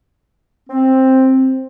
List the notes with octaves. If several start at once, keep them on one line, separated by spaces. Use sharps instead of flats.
C4